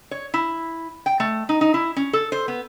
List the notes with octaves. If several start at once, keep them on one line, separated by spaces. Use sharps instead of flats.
C#5
E4
G5
A3
D#4
D#4
E4
C#4
A4
C5
B3